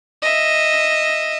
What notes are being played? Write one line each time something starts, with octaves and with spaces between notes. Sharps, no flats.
D#5 E5